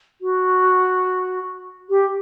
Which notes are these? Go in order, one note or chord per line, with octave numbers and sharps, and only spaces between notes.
F#4
G4